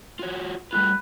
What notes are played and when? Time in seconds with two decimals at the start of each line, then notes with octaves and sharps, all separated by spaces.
0.19 F4 F#4 C#5
0.73 G3 A3 F4 B4